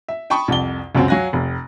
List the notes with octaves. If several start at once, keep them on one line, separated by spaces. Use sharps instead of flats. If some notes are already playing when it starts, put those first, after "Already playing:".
E5
G5 A5 B5 C#6 D#6
C2 F2 F#5 A5 G7
C#2 F#2 C4 F#4
F#3 F5 G#5 F#6 A#6
F1